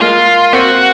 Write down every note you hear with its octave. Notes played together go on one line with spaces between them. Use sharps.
G#3 A#3 F4
A#3 C4 F#4